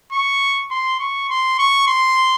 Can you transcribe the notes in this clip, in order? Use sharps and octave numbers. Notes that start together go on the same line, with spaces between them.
C#6
C6
C#6
C6
C#6
C6